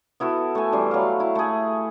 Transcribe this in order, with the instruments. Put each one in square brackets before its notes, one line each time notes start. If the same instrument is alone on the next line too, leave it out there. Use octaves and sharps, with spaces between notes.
[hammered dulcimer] B3 E4 F#4 A4
A3 G#5
E3 G3 C6
F#3 F5
E4
A3 G#4